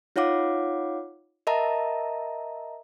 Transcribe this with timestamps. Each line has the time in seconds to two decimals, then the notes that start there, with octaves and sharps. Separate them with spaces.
0.16 D#4 F4 C#5 F5 F#5 D6
1.47 A#4 D#5 E5 A5 A#5